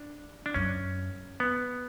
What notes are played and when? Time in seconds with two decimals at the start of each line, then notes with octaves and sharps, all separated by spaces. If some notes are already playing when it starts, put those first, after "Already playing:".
Already playing: D4
0.46 D4
0.54 F#2 C#4
1.40 B3